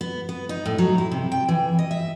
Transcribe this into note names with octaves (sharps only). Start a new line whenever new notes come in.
B3
B3
D#4
A2
F#3
E4
C3
G5
E3
D#5
E5